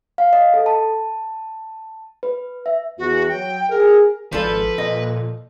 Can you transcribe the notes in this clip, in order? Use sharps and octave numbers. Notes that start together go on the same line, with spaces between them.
F5
D#5
A4
A5
B4
E5
E2 F#4
F#3 G5
G#4 A#4
G#1 F3 A4 B4 D5
A#2 D#5